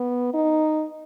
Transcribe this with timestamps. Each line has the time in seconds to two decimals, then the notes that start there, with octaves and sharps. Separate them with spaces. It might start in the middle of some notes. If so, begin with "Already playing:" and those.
Already playing: B3
0.34 D#4